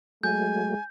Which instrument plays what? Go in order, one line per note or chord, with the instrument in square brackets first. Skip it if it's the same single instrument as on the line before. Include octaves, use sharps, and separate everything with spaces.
[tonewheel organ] F#3 A3 [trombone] G#3 [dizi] G#5 [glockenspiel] G6